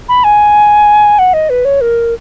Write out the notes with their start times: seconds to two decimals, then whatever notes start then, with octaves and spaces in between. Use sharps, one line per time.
0.08 B5
0.24 G#5
1.18 F#5
1.33 D#5
1.49 B4
1.65 C#5
1.81 A#4